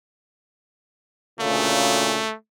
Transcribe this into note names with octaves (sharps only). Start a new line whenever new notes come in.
D2 A#2 C#3 A3